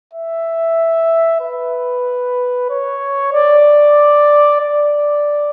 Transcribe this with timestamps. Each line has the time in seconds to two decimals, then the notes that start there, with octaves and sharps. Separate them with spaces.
0.13 E5
1.41 B4
2.69 C#5
3.33 D5
4.61 D5